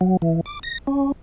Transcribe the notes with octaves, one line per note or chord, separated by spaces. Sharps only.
F#3
E3
D6
A#6
C#4